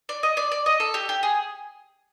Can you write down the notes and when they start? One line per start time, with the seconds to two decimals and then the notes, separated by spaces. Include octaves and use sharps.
0.09 D5
0.23 D#5
0.37 D5
0.52 D5
0.66 D#5
0.80 A4
0.94 G4
1.09 G4
1.23 G#4